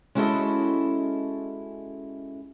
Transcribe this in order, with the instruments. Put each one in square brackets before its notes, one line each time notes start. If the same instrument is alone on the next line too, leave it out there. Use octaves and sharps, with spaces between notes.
[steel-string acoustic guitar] G#3 C#4 E4 F#4 A4 D#5